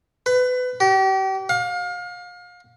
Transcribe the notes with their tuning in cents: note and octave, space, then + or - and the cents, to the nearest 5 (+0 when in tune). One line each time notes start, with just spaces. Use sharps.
B4 +25
G4 -35
F5 +30